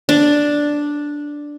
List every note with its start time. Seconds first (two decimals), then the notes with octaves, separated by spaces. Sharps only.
0.09 D4